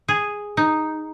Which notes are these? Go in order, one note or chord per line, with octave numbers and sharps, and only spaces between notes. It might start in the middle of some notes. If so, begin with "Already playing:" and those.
G#4
D#4